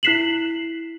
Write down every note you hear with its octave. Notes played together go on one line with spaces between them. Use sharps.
E4 F#6 B6 C7 E7 F#7